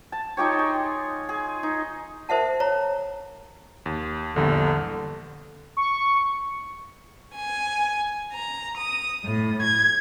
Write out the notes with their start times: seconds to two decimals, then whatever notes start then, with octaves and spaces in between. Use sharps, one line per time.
0.12 A5
0.37 D#4 F4 G4 C#5
0.59 G#4
1.29 G#4
1.63 D#4
2.29 A#4 C5 E5 F#5 A5
2.60 C#5 A#5
3.86 D#2
4.36 A#1 E2 G2 D3
5.77 C#6
7.34 G#5
8.32 A#5
8.76 D#6
9.24 A2
9.62 G#6